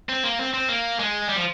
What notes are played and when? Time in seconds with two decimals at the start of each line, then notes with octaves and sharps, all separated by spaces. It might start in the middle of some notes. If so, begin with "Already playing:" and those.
0.09 C4
0.24 A#3
0.39 C4
0.54 C4
0.69 A#3
0.99 G#3
1.29 G3
1.36 F3